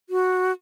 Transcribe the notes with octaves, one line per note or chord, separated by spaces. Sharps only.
F#4